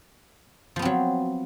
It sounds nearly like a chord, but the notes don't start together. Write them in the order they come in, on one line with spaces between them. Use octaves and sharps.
F3 B3 C4 F#3